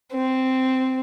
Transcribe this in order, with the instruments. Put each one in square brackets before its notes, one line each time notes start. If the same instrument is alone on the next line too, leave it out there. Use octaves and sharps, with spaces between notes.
[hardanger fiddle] C4